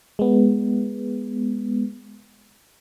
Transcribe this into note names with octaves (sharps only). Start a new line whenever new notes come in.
G#3 B3